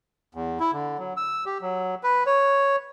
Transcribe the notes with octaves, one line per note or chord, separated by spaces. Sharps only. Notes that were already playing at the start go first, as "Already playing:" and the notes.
E2
E4
D3
F#3
E6
G4
F#3
B4
C#5